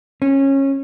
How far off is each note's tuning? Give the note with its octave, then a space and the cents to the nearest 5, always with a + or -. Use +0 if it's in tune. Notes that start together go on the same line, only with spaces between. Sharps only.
C#4 -20